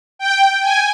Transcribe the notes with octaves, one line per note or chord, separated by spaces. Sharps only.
G5
G#5